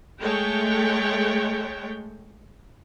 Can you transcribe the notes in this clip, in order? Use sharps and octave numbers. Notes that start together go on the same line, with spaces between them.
G#3 A3 C#5 G5